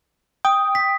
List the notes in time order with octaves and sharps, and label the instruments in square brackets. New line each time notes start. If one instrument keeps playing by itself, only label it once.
[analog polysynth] G5 [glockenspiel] D#6
[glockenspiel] B6